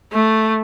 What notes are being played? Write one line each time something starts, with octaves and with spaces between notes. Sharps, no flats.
A3